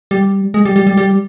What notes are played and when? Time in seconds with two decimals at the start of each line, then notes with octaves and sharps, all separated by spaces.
0.11 G3
0.54 G#3
0.65 G3
0.76 G3
0.87 G3
0.97 G3